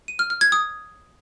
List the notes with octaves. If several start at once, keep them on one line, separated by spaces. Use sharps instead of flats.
D#7
F6
F6
G#6
D#6